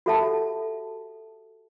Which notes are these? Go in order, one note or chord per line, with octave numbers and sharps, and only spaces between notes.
F#4 G4 A4 E5 F#5 A5